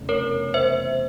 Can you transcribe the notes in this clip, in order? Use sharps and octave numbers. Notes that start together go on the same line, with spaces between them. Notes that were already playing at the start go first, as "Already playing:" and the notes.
Already playing: F1 E2 C#3 E3
A#4 C#5
C5 E5